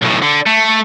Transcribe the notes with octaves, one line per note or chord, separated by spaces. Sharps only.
B1 A2
D3
A3